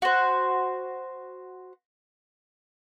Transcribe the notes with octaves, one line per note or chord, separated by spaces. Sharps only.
F#4 C5